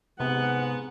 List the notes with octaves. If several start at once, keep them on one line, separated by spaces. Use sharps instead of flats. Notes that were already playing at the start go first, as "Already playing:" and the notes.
G#2 C3 B3 F#5